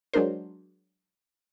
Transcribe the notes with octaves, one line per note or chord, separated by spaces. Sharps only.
F#3 G#3 D4 A#4 C5